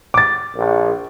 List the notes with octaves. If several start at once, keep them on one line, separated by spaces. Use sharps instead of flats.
D6 A6
A#1